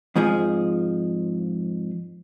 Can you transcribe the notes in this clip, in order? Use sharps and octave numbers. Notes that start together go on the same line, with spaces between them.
F2 G#2 F3 G#4